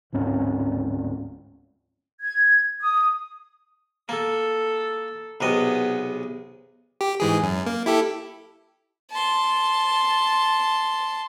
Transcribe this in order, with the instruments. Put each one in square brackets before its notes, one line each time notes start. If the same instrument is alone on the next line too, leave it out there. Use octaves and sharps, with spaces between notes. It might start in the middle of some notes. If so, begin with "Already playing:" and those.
[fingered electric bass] D1 G#2 C4 C#4
[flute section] G#6
D#6
[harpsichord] A#3 [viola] A4
[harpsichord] B1 C3 D#5 [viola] B3 G#4
[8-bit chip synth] G4
G#2 E3 G#4
F#2
A#3
E4 G4 A4
[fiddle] A5 C6